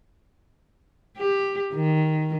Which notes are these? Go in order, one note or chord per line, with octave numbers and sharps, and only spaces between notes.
G4
D#3